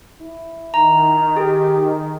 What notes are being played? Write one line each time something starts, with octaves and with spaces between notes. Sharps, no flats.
E4
D#3 A#5
G4 G#4